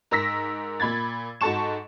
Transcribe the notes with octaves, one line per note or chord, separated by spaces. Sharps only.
G#2 A#4 E6 A#6 B6
A#2 B5 G#6 A6
G#2 F#4 A4 A5 C#6 E7